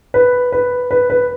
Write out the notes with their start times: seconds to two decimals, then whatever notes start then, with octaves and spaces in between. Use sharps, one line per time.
0.14 B4
0.52 B4
0.91 B4
1.10 B4